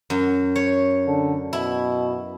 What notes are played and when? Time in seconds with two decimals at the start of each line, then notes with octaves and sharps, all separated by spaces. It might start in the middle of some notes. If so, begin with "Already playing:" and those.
0.10 F#2
0.56 C#5
1.07 D3
1.53 B2 E4